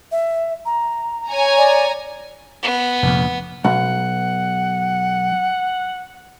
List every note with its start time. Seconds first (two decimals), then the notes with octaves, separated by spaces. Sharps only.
0.12 E5
0.66 A#5
1.29 C#5 G#5 A#5
1.58 D5
2.62 B3
3.03 F1 A#1 F2
3.65 B1 F#5